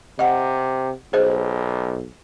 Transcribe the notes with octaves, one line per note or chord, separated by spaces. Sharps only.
C3 D#5 F#5
B1 G#4 C5 D#5